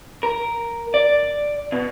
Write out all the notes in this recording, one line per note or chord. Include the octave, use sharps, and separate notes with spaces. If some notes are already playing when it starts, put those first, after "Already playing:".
A#4
D5
B2